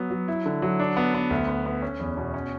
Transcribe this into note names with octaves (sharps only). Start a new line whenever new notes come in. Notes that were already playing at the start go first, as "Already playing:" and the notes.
Already playing: F#3 B3
F#3
E4
D3
F#3
D4
B3
B3
D2
B3
B3
C#4
E2
B2
C#4